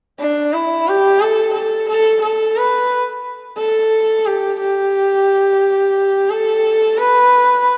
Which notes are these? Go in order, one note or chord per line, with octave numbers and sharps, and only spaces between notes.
D4
E4
G4
A4
A4
A4
A4
B4
A4
G4
G4
A4
B4